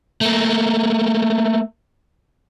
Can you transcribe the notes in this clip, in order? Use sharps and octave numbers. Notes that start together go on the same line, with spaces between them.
A3 A#3